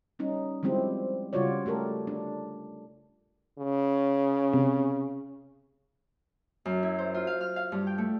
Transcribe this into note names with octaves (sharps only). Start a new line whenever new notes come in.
G3 C#4 D#4
F3 G3 G#3 C4 E4 G4
C#3 G3 F4 F#4 C#5 D5
A3 G4 A4 A#4
D4
C#3
C3
F#2
E4
C5
F4
F5
F6
F5
G2
G5
A3